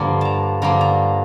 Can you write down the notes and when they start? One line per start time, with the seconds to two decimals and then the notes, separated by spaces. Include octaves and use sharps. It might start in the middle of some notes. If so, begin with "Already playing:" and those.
Already playing: G2 D3 F3 A#3 D4
0.21 A5 A#5
0.62 G2 D3 F3 A#3 D4 A#5
0.81 A#5